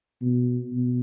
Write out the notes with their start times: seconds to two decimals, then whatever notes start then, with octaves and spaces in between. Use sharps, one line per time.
0.22 B2
0.73 B2